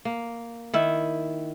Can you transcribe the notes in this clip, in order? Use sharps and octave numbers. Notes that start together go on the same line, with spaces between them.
A#3
D#3 E4